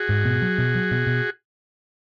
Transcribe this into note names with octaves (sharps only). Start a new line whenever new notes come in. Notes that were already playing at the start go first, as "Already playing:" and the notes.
Already playing: F#4 G#4
G#2
B2
F#3
B2
F#3
B2
B2